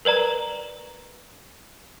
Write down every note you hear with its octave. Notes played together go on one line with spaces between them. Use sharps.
A#4 B4 D5 A#5